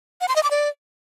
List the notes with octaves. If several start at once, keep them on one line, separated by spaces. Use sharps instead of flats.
F#5
C6
D#5
D6
D5